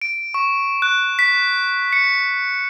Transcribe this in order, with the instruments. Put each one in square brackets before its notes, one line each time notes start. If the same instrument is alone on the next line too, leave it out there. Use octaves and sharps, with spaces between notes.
[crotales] D7
C#6
F#6
B6
C#7